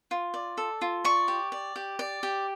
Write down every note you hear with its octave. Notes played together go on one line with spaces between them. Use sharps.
F4
D5
A4
F4
D5 C#6
G4
D5
G4
D5
G4